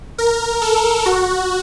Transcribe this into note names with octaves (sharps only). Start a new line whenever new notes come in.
A#4
A4
F#4